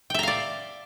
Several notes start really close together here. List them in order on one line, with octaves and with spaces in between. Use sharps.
G5 E5 A#5 F5 D5